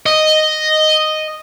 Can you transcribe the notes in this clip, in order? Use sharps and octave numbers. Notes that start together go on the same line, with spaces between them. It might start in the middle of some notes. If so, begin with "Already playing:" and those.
D#5